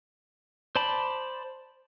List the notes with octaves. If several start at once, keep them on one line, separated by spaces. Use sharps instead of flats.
C5 D5 A5 B5